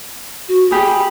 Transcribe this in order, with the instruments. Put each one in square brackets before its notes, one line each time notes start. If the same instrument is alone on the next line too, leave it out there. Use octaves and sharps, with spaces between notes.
[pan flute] F#4
[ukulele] G4 G#4 [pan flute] B5